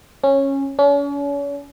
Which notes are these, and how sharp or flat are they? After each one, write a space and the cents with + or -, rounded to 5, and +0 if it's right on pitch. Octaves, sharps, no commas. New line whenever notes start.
C#4 -15
C#4 +40